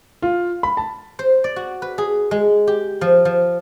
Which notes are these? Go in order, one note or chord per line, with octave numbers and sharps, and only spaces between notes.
F4
B5
A5
C5
D5
F#4
B4
G#4
G#3
G4
F3
F3